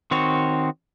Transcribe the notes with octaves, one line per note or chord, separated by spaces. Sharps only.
D#3 C4 F#4 C#5